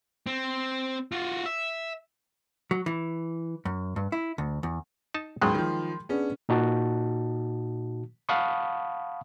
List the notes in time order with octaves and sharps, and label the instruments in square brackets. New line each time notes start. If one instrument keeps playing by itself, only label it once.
[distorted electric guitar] C4
F4 F#4
E5
[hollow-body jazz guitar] F#3
E3
F#2
G2
E4
D2
E2
[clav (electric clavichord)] D#4 A5
[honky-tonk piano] A1 D#2 [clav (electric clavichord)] F#3 G#3 [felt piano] G5 B5 C6
[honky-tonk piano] D#3 F3
[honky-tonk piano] B3 C#4 [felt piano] D4 G#4
[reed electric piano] A#2 D#4 F#4 A5
F5 F#5 A5 B5 C#6 D#6